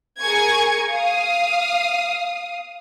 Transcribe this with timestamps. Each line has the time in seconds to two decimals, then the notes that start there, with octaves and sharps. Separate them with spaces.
0.20 G#4 A#4 G#5 C#6 G#6
0.90 F5 D#6